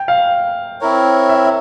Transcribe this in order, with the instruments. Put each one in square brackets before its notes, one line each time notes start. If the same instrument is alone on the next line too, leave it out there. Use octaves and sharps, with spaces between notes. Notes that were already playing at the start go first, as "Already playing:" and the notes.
Already playing: [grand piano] G5
F5
[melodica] C4 E4 A#4 C#5
[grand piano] E5